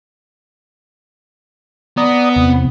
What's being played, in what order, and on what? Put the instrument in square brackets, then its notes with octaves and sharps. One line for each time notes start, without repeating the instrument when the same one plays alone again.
[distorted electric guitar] B3 [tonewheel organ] D5 A#5 D#6
[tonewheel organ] E2 C3